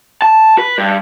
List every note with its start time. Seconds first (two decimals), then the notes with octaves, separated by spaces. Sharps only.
0.22 A5
0.58 B4
0.78 G2